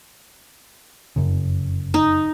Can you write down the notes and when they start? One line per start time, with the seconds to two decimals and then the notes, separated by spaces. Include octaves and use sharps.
1.16 F1 F#2 C#3
1.94 D#4